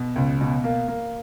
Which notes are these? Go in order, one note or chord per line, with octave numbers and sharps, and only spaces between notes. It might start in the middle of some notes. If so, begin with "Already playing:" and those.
Already playing: B2
C#2
B2
A#3
A#3